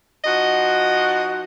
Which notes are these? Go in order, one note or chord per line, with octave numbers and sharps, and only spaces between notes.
F3 D#4 F#4 D#5